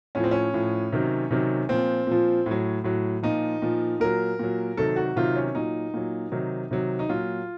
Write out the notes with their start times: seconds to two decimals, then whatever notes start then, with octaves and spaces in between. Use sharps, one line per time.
0.15 A2 F3 C#4
0.24 C4
0.31 C#4
0.54 A2 F3
0.92 C3 D#3 F#3
1.31 C3 D#3 F#3
1.69 A#2 F3 C4
2.07 A#2 F3
2.46 A2 F#3
2.84 A2 F#3
3.23 A#2 F3 D#4
3.62 A#2 F3
4.00 A#2 F#3 A#4
4.39 A#2 F#3
4.77 C3 D#3 F#3 A4
4.96 F#4
5.16 C3 D#3 F#3 F4
5.36 C#4
5.55 A#2 F#3 D#4
5.94 A#2 F#3
6.32 C3 D#3 F#3
6.71 C3 D#3 F#3
6.99 D#4
7.09 A#2 F#3 F4